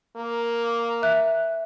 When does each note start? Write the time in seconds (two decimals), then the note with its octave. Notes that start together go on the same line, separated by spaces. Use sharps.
0.17 A#3
1.02 E5 F#6